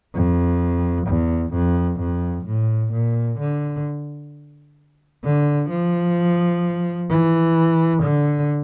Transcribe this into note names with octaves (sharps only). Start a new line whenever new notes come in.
F2
E2
F2
F2
A2
A#2
D3
D3
F3
E3
D3